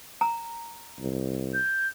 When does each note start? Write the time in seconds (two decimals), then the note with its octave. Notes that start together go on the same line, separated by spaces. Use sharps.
0.21 A#5
0.99 C2
1.53 G6